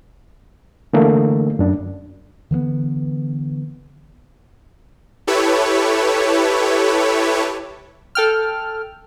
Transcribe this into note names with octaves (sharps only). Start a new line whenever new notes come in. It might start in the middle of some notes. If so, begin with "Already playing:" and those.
D3 E3 A3 A#3
F#2 D4
D3 E3 G#3 B3
E4 G4 A4 B4 C#5
A4 G5 F6